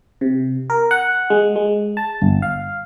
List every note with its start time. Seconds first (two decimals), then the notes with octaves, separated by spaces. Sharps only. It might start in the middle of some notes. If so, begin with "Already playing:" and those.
0.21 C3
0.70 A#4
0.91 F#5
1.30 G#3
1.56 G#3
1.97 A5
2.22 G1
2.42 F5